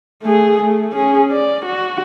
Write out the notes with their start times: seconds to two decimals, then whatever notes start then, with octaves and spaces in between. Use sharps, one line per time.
0.23 A3 G#4
0.62 A3
0.93 C#4 G#4
1.32 D5
1.66 F#4